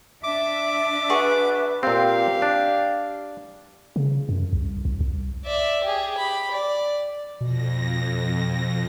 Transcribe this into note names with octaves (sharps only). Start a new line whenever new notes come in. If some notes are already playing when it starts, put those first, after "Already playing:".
D4 E5 D6
F#4 G#4 B4 C#6
A#2 C4 G4 F5
D4
C#3
F#2
C2
C2
C2
D5 E5
G4 G#4
G4 B5
D5
F2 B2 A#6